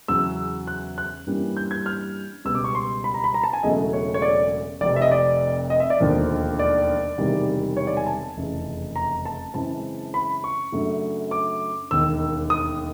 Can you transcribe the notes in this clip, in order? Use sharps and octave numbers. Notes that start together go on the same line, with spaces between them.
E2 C#3 F#3 E6
F#6
F#6
G2 E3 G3 A#3 C#4
G6
G#6
F6
C#2 B2 G3 B3 E6
D6
C#6
C6
B5
A#5
B5
A#5
A5
G#5
E1 E2 C#3 F#3 A3 D#5
C#5
C#5
D5
F1 F2 C3 D5
E5
D#5
D5
D#5
E5
D5
E1 D#2 D3 F3 A#3
D5
E1 E2 C3 D#3 G3
C#5
D5
G#5
A5
F1 E2 C#3
A#5
A5
F#2 C#3 E3 G#3 C4 A5
B5
C#6
F#2 C#3 F#3 A3 D4
D6
E1 D#2 D#3 E6
D#6